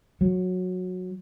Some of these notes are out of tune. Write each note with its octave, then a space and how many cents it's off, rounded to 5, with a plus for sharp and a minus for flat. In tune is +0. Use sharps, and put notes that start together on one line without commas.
F#3 -15